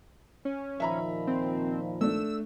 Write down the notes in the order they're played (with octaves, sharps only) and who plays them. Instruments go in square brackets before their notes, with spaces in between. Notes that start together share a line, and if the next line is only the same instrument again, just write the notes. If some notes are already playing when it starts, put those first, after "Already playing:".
[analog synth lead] C#4
[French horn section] A#2 D#3 F3 [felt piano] E5 A#5 B5
[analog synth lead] C4
[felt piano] A3 D4 [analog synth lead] E6